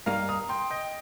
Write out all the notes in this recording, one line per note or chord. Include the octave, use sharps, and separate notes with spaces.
G2 G3 A#3 D#4 F5 A#5
A#5 D#6
G5 C6
D#5 G5